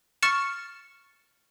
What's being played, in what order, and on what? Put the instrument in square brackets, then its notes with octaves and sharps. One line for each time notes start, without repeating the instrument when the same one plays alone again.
[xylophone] C#6 F6 A6 C#7 E7